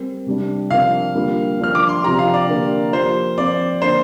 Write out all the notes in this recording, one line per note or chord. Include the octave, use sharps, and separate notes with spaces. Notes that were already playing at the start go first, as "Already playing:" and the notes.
Already playing: G3 C4 A#4
C3 G3 D4
C3 F3 D4 A#4 F5
D3 G3 A#3 F4
F3 D4 A#4 F6
D6
C6
C3 F3 D4 G4 A#5
F5
D5
D3 A#3 G4 A#4
F3 A#3 G4 C5
F3 C4 F4 C5 D5
D3 A#3 D4 C5